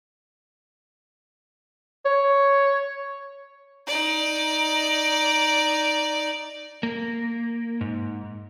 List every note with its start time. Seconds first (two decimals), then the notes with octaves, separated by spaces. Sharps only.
2.05 C#5
3.87 D#4 D5
6.83 A#3
7.81 G#2